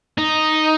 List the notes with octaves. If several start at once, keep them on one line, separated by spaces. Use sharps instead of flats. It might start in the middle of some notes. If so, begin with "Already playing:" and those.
D#4